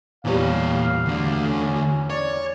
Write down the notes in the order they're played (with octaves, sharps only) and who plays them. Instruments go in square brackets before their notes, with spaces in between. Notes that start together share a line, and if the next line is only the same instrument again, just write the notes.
[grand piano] E2 E3 G3 [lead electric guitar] A#2 C#5 [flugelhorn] F5
[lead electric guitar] D2 D3
[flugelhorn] C#4
[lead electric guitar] C#5 [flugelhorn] D5